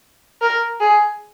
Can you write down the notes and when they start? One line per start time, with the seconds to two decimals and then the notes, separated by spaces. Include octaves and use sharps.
0.42 A#4
0.81 G#4